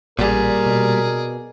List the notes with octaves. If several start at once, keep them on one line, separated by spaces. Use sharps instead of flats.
A1 A#2 G3 G#4 A#4 D5
B2